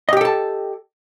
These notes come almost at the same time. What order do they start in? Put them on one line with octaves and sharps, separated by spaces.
D#5 G4 G5 A4 A5